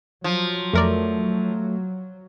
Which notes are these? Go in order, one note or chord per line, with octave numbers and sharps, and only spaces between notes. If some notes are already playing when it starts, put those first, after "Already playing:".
F3 F#3
F2 A3 A#4 D5